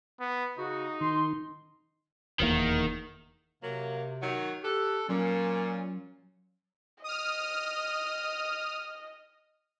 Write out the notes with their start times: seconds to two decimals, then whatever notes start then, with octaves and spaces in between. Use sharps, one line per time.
0.20 B3
0.58 C#3 D#4 F#4
1.01 D#3 C6
2.40 F1 E2 D#3 A#3
3.62 C3 F#3 A#3
4.22 D#3 F#3
4.63 G4 A4 F#6
5.08 A#2 F#3 C#4
7.04 D#5 D#6 F6